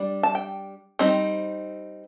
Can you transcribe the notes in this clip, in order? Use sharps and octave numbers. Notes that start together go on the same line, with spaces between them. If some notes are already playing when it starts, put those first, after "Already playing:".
Already playing: G3 D4
A5
G5
G3 C4 D#4